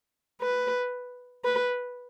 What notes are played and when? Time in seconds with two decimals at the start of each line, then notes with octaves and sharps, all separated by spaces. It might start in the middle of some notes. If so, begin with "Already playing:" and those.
0.41 B4
1.45 B4